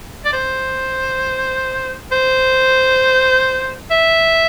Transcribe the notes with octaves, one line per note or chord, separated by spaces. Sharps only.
D5
C5
C5
E5